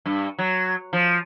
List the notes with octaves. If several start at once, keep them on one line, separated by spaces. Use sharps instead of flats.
G2
F#3
F3